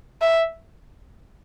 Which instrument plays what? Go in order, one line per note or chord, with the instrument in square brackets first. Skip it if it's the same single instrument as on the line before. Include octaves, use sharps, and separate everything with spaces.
[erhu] E5